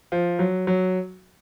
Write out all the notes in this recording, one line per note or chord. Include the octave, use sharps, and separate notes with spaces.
F3
F#3
F#3